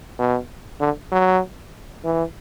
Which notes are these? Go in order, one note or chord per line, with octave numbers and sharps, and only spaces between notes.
B2
D3
F#3
E3